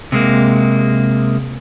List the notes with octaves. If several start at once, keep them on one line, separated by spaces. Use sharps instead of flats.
C3 G#3 A#3